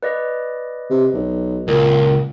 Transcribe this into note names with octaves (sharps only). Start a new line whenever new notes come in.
B4 D5 D#5
C3
B1
C#2 A#2